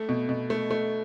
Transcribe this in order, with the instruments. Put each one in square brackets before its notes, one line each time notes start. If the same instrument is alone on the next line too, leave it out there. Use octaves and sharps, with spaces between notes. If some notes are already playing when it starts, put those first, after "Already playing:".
Already playing: [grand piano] A3
B2
B2
A3
A3